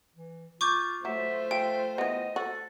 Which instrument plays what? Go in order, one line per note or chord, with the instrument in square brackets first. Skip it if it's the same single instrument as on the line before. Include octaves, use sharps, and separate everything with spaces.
[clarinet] E3
[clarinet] F4 [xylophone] C#6 D6 G6
[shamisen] F#3 [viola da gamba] A3 F4 C5 [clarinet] E5
[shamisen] F3 [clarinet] E5 [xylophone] G5
[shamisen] E3 B3 [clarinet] D#5
[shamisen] F#4 [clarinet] A4